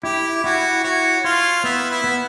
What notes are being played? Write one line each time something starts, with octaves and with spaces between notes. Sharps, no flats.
E4 G4
E4 F#4
F#4 C#5
F4 C#5
B3 E4
E4
B3